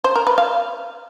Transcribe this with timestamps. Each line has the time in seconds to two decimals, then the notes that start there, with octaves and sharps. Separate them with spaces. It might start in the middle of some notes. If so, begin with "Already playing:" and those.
0.04 C5
0.15 A#4
0.27 B4
0.38 F5